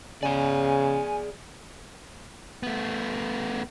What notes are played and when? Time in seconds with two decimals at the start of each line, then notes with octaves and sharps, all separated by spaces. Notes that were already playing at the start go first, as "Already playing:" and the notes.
0.23 C#3 G#4 D5 G#5
2.63 A3 B3